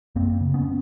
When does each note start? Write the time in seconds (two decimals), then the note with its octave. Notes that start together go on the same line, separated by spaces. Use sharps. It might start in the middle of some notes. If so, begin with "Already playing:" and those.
0.16 F#2 A#3 C4
0.41 C#3
0.54 B3 C#4